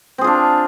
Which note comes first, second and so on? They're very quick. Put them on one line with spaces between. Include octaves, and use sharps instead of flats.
C4 G#4 F4 D4